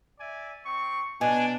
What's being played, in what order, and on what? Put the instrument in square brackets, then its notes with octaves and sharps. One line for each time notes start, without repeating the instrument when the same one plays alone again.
[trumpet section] D5 E5 G#5
C4 C#6
[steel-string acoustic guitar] B2 [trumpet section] D4 [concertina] G#5